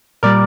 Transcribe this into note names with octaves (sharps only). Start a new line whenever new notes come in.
A#2 G3 A#4 D5